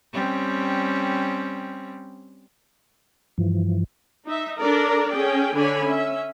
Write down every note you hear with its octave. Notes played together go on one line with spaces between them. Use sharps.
G3 C4 C#4
G2 E3 F3
D#4 E5
D4 A4 A#4 D5 A#5
C#4 G#4 A4 G5
D3 D4 C#5 G#5 B5
C#4 E5